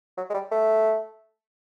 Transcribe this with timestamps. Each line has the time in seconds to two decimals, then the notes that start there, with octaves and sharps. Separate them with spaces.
0.18 F#3
0.30 G#3
0.34 G3
0.51 A3